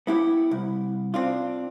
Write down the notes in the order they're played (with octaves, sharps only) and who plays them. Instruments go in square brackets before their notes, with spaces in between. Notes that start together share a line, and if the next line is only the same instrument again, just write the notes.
[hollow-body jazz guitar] B3 E4 G4
C2
C4 D4 F4